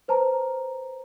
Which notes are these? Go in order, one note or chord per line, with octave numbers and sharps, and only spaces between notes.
B4 C5 A5 A#5